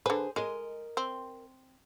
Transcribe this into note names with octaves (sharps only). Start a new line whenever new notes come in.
D3 G#4 B4 C5
G#3 A#4 D#5
C4